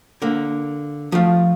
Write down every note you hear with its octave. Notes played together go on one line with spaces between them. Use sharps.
D3 A#3
F3 A3 F5